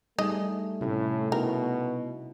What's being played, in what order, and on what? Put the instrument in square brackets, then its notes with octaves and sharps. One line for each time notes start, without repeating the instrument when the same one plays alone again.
[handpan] G3 D#4 G#4 [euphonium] A3 [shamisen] D#5
[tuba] A2 [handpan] C3 C#4
[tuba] B2 [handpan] D#4 E4 [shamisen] A#4